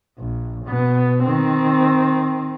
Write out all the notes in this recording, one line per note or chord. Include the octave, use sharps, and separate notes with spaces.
A#1
B2 B3
D#3 C4